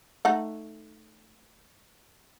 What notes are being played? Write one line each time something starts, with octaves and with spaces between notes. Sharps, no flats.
A3 D#4 F#5